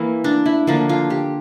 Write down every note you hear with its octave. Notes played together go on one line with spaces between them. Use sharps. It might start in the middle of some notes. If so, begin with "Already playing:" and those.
Already playing: E3 A#3 E4
D4
E4
D3 F3 A#3 D4
F4
G4